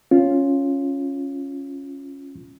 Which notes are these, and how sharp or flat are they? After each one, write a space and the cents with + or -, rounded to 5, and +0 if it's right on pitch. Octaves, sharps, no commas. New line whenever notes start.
C#4 -5 F4 +0